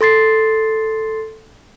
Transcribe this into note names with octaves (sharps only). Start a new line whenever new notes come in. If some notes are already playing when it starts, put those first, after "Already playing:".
A4 C6 A6 C7